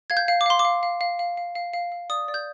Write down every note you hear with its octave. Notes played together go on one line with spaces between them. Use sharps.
F5 G#6
G6
F5
D6
F5 C6
D6
F5
F5
F5
F5
F5
F5
F5
F5
D5 D#6
D5
G6